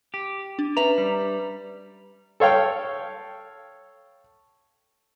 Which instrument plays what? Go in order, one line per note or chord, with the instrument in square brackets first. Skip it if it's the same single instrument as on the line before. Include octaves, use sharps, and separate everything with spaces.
[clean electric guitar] G4
[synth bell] D4
[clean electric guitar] C#4 A#5 [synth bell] B4 E5
[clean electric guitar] G3
[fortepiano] A4 C#5 F5 G5